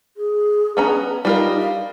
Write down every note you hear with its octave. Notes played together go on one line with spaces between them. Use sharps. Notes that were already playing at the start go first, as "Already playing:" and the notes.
G#4
B3 C#4 A#5
G3 D#4 F4 A#4
F5